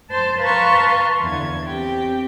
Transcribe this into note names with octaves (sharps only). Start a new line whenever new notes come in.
C5 A5 C6
B4 F5 A5 A#5 C6 C#6
E2 D3 G#6
C4 G4 G5